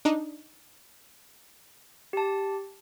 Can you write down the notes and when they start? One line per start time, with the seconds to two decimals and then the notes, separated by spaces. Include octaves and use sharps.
0.05 D4 D#4
2.13 G4 A5